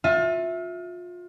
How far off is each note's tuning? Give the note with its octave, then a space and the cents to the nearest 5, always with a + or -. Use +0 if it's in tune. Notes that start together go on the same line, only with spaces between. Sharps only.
F4 +30 E5 +0